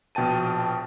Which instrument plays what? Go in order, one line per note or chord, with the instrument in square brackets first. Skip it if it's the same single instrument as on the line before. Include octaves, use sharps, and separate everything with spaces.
[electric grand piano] A#1 B2 G5 A5 D#7